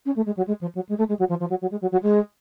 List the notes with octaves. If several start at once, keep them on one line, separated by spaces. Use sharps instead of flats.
C#4
A3
G#3
F#3
G#3
F3
F#3
G#3
A3
G#3
F#3
F3
F3
F#3
F#3
G#3
F#3
F#3
G#3